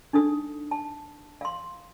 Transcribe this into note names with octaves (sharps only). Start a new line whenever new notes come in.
D4 D#4 A4 D#6
A5
F5 C6